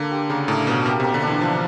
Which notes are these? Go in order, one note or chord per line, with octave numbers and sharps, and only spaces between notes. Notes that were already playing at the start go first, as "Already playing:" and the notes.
Already playing: D3 A#3 D4
G4
C#3 A#3
A2 D4
B2 A#3
B2 G4
C3
A#3
D3
E3 D4
F3 A#3